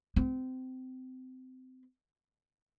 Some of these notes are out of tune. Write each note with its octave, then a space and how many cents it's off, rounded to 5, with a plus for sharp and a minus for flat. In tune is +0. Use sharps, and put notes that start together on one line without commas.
C4 -25